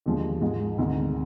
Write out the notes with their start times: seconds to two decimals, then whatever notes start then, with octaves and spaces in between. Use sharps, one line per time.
0.06 D#2 D3 F3 G#3
0.41 G#2 F3 G#3
0.78 D2 C3 D#3 G#3